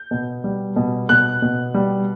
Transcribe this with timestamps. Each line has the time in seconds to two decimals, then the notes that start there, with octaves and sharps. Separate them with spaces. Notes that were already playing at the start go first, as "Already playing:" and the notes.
Already playing: G6
0.11 B2
0.44 G3
0.76 B2
1.09 B2 F#6
1.42 B2
1.74 G3